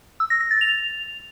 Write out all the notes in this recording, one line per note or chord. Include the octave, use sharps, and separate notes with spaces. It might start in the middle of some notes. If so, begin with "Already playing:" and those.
E6
A#6
A#6
A6
F7